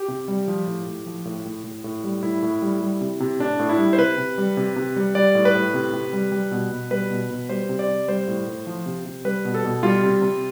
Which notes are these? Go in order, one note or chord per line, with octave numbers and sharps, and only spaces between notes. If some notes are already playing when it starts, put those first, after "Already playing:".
Already playing: G4
C3
G3
F3
A2
A2
F3
A2
A2
A2
A2
G3
A2 E4
A2
G3
G3
C3
C3
A2 D4
A2
E4
G3
C5
C3 B4
C3
G3
C3
C3
G3
G3 D5
A2
B4
A2
C3
C3
G3
G3
B2
B2
G3 B4
B2
B2
G3 C5
C3
D5
C3
G3 C5
A2
A2
F3
C3
C3
G3 B4
B2
A4
B2
G3 F4
C3
C3